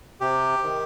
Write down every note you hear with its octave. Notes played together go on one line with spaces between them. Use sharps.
C3 G4
D#3